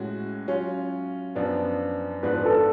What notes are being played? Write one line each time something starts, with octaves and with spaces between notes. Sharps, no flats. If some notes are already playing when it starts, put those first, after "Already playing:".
Already playing: A2 G#3 C#4 F#4
F#3 C#4 F4
F#2 F3 B3 D4
G#2 F3 B3 D4 F#4 B4
B4
A4